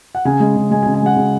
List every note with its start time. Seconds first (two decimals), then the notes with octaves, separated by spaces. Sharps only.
0.15 F#5
0.25 C#3 G#5
0.40 G#3
0.56 C#3
0.71 G#3 G#5
0.83 G#5
0.86 C#3
0.94 G#5
1.02 G#3 F#5
1.17 C#3